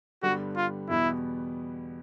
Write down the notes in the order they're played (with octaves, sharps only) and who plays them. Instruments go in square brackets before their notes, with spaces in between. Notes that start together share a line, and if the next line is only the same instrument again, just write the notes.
[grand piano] G2 D3 G3 B3 [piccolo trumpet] F#4
[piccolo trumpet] F4
[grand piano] E2 B2 G3 B3 [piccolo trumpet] E4